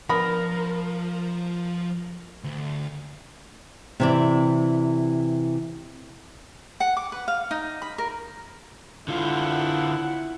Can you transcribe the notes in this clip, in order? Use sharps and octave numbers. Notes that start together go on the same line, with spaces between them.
F3 B3 D4 A#4 B5
D2
C3 E3 D5
F#5
D6
B4
F5
D#4
B5
A#4
D3 E4 F4 F#5